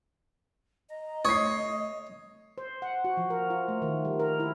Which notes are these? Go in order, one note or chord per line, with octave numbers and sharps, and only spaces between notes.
D#5 A#5
A3 C#5 D#6 C7
C5
F#5
F#4
F3
A#4
F4
A3
D#3
G3
A#4
E4